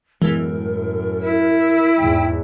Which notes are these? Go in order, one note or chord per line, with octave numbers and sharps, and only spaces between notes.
F#2 A2 E3 G#3 B3 A#4
E4
E2 G#2 G5